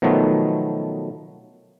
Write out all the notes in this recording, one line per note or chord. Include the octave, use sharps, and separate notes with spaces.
B2 D#3 F3 F#3 A3 B3